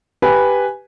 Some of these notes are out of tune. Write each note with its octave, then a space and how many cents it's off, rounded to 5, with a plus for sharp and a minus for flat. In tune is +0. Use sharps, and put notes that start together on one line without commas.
G4 +0 B4 +0 G#5 +0